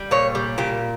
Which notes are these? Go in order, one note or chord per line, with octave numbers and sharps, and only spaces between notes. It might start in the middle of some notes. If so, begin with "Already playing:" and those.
Already playing: G3
A#2 C#5
G3
A#2 G4